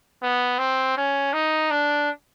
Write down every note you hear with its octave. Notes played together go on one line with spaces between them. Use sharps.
B3
C4
C#4
D#4
D4